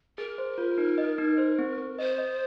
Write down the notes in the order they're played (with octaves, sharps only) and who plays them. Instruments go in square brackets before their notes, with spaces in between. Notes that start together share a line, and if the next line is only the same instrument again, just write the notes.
[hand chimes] G#4 [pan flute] A#4
[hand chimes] C5
F4
D#4
D#5
D#4
C5
C4
C4
[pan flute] C5 [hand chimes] D#5
[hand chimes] D#5